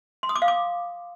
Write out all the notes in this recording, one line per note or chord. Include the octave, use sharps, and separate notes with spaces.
C6
D#6
D6
F5
D6